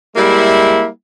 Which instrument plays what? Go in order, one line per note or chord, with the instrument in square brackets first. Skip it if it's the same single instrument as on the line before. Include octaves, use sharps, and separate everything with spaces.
[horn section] G3 G#3 A#3 E4